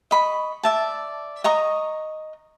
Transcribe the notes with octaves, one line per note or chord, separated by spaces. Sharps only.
D#5 B5 C#6
D5 E5 A5
D#5 A#5 C#6 D#6